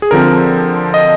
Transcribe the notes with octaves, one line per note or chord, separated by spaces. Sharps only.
G#4
D3 F3 C4 A#4
D#5